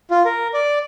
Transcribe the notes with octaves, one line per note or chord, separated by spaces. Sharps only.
F4
A#4
D5